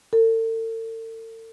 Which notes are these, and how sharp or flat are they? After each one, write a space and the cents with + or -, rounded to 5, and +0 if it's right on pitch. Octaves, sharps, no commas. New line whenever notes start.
A4 +40